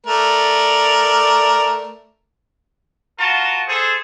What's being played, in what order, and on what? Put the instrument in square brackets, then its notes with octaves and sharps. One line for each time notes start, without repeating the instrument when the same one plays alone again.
[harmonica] A3 A#4 D5
[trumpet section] F4 F#4 A#4 A5
G#4 A4 C5